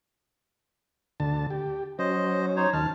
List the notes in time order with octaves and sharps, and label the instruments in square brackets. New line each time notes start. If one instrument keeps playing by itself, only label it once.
[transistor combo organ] D2 D3 A5
G4
[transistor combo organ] F#3 C#4 [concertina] C5 D#5
[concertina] D#4 C5 C#5
[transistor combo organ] D#2 D#3 F6 [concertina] A5